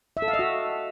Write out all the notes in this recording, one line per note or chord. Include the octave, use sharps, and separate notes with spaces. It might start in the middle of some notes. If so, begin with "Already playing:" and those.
E5
A4
F5
D#5
F#4